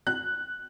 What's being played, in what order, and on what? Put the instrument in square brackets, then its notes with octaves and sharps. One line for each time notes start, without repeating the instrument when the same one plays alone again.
[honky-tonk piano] F#6